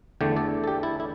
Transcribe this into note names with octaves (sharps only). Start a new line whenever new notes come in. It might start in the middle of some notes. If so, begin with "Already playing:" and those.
E2 D3 A3 D5 G5
A4 D5
A4
G4
E4 A4
E4